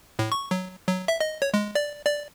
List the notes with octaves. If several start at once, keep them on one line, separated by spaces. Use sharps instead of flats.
A2
C#6
F#3
F#3
E5
D#5
C#5
G#3
D5
D5